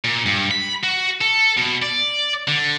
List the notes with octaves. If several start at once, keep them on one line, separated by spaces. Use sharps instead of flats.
A#2
G2
B5
F#4
A4
B2
D5
D3